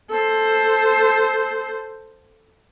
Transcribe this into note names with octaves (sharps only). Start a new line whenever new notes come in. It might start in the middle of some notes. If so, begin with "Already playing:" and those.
A4 C5